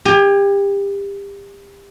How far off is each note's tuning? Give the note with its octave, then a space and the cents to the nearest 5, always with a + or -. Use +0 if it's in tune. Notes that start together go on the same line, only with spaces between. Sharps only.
G4 +30 G#5 +0